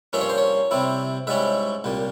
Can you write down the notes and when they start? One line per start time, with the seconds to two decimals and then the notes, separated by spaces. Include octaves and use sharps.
0.13 G2 F3 A#3 C#4 E5
0.21 C#5
0.29 C5
0.38 C#5
0.71 C3 G3 C4 E4
1.27 G#2 G3 C#4 E4 E5
1.84 C2 A#2 G3